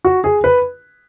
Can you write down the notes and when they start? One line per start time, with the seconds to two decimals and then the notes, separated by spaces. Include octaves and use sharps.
0.05 F#4
0.24 G#4
0.44 B4